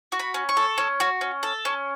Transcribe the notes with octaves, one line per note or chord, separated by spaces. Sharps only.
F#4
B5
C#4
C#6
A4
C#4
F#4
C#4
A4
C#4